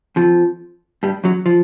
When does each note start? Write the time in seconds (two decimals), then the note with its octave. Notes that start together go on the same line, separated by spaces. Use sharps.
0.16 F2 F3
1.03 G2 G3
1.24 F#2 F#3
1.46 F3